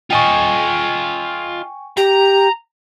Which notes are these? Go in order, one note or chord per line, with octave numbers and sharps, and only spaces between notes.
F4 D#5 G5 G#5 C#6
G4 A#5